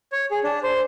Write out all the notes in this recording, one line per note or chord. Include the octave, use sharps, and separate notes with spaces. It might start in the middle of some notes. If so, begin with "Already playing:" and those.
C#5
G#4
D4
C5